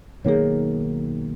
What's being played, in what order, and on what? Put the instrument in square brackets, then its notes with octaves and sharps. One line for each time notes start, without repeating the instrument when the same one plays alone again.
[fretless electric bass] B1 D#3 A#3 [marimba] G#4 C#5